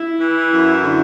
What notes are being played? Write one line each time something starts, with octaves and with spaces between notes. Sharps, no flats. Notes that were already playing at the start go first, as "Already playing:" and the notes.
Already playing: E4
E3
F#2
D3